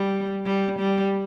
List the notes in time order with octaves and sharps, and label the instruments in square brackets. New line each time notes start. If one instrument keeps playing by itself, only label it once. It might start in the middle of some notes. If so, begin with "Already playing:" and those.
Already playing: [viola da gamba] G3
G3
G3